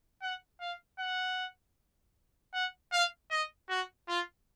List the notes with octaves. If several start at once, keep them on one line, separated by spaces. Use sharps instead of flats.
F#5
F5
F#5
F#5
F5
D#5
F#4
F4